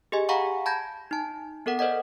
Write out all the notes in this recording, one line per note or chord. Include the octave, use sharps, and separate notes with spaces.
G4 G#4 D#5 G#5
F5 F#5 G#5 A#5 B5 C#6
A5 B5 G6 G#6 A#6
D#4 A5
B3 A4 A#4 F#5
A#4 C5 D5 D#5 F#5